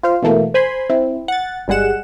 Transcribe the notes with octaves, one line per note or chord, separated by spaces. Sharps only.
F4 C5 F5
B2 E3 A3 A#3
C5 G#5 B5 C6
C4 E4
F#5 A6
G1 G3 G#3 G#4 F#5 E7